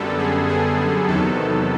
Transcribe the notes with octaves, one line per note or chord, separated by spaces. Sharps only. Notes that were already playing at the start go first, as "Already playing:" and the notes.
Already playing: F#2 D3 G3 B3 A4
G#4
G#4
G#4
E2 C3 D#3 F#3 B3 A4